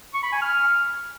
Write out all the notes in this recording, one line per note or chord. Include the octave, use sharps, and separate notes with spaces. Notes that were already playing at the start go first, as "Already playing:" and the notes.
C#6
B5
G#5
F6